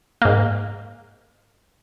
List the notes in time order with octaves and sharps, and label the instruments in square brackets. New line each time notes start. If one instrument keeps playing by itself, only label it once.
[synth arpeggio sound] G#2 A#3